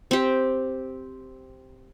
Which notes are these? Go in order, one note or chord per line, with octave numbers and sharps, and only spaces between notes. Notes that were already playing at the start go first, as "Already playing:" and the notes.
C4 G4